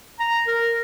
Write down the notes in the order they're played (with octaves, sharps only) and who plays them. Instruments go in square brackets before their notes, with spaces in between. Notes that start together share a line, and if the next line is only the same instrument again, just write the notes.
[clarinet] A#5
A#4